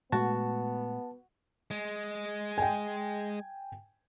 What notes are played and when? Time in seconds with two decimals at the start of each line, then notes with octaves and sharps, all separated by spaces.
0.12 A#2 G#3 A3 B3 F#4 A5
1.71 G#3
2.58 G5 G#5